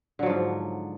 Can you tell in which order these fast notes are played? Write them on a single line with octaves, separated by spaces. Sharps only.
D3 F#3 F3 G#2